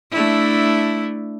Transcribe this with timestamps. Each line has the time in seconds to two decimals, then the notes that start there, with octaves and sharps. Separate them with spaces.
0.12 A3 D4 E4